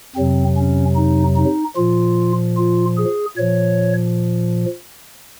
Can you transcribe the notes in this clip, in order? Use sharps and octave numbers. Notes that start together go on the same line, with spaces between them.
F2 C3 F#3 C4
C#4
D#4
D#4
A#2 F3 F4
F4
G#4
A#2 F3 C#5